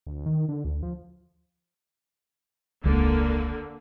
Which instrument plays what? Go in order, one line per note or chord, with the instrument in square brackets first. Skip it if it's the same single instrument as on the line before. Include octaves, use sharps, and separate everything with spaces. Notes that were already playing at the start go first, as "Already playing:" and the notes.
[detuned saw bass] D2
D#3
D3
D2
F3
[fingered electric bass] E1 C#2 [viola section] D3 A#3